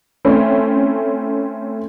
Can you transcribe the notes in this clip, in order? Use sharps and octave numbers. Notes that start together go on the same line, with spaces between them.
A3 C4 C#4 E4